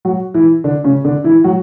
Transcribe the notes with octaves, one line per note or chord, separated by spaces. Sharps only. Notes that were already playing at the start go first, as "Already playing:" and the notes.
F#3 F#4
E3 E4
D3 D4
C#3 C#4
D3 D4
E3 E4
F#3 F#4